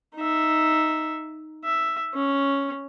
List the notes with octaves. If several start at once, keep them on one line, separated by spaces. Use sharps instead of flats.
D#4 E5
E5
C#4